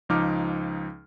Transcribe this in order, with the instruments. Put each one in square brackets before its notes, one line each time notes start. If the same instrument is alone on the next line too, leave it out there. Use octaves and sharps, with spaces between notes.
[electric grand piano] C#2 F3 D#4 D6 F6